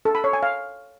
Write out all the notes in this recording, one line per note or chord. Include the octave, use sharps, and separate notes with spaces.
A4
B5
C#5
G#5
F5